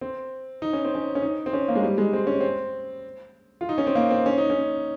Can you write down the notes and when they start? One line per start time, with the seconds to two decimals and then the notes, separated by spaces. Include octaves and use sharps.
0.01 C4
0.62 D#4
0.73 C#4
0.85 C4
0.95 C#4
1.15 C#4
1.22 D#4
1.46 C4
1.53 C#4
1.68 A#3
1.75 G#3
1.83 G3
1.98 G#3
2.13 C4
2.27 C#4
2.41 C4
3.61 F4
3.69 D#4
3.78 C#4
3.87 C4
3.95 A#3
4.11 C4
4.26 C#4
4.38 D#4
4.50 C#4